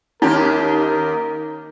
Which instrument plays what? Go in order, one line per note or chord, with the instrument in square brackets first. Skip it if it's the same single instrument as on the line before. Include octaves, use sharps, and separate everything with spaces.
[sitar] D#2 A#3 G4 [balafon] C#4 [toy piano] D#4 [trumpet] A#4